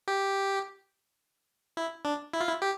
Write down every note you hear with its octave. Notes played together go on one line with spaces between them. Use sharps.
G4
E4
D4
E4
F4
E4
G4